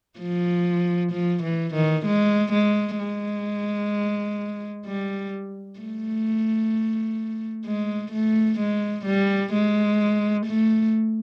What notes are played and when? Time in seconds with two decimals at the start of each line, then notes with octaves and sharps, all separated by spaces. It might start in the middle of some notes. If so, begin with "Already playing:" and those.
0.19 F3
1.12 F3
1.43 E3
1.75 D#3
2.06 G#3
2.53 G#3
2.99 G#3
4.86 G3
5.80 A3
7.66 G#3
8.12 A3
8.59 G#3
9.06 G3
9.53 G#3
10.46 A3